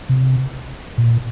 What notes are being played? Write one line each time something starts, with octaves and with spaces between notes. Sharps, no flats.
C3
A#2